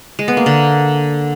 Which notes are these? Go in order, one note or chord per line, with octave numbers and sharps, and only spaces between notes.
G#3
B3
A#3
D3